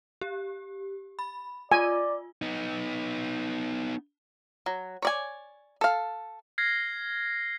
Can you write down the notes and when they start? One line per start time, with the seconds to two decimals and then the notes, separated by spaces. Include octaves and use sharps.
0.21 G4
1.19 B5
1.72 F4 D5 G#5
2.42 B3 D#4
4.66 F#3
5.02 C#5 D5 G#5
5.81 A4 F5
6.58 F6 G#6 A#6 C7